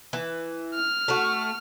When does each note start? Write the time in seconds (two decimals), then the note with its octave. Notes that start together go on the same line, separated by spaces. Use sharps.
0.13 E3
0.75 F6
1.08 A3 F#4